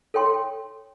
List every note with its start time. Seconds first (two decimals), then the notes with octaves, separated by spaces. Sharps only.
0.14 A4 C#5 G5 C6